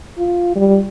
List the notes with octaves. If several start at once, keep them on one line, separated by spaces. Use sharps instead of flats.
F4
G3